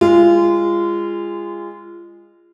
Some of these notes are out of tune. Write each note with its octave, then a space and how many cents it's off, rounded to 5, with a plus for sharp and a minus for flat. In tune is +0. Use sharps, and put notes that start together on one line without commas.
G#3 -25 F4 -25